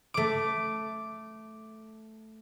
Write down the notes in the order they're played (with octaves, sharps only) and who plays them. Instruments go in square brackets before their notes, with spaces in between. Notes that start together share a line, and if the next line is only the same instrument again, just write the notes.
[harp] A3 D6